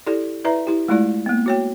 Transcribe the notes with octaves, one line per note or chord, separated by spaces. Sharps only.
E4 G4 A4 D5
E4 B4 D5 E5 A#5
E4 G4
G#3 A3 E4 F4 D5
A#3 B3
F#4 C#5 G5